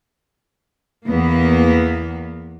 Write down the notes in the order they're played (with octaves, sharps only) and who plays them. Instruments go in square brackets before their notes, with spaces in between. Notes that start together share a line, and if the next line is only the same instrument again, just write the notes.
[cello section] E2 A#3 B3